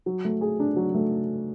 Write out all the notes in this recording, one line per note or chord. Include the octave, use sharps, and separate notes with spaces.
F#3
A3
G#4
D4
F#3
A3